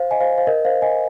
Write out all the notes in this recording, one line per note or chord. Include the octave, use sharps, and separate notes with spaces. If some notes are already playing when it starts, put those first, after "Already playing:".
Already playing: C5 F5
D#5 G#5
C5 F5
C5 F5
A#4 D#5
C5 F5
D#5 G#5